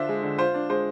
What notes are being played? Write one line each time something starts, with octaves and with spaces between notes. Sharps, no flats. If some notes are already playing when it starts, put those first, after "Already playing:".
Already playing: D3 D4 F4 C5 E5
G#3
D3
F4 C5
D4
G#3 C5